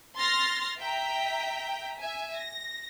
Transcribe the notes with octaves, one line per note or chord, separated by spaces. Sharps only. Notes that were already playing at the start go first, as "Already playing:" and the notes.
C6 F6 A6 A#6
E5 G5 A#5 B6
E5 G#5
A#6